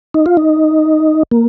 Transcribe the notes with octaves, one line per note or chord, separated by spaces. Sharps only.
D#4
F4
D#4
A#3